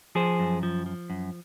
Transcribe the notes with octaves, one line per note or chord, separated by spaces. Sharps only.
F3 G#4 C5
F#2
F3
F3
F#2